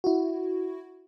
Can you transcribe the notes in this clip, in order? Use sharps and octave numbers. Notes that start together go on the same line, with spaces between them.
E4 F#4